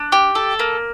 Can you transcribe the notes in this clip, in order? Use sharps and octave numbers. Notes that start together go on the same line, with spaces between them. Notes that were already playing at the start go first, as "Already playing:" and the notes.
Already playing: D4
G4
A4
A#3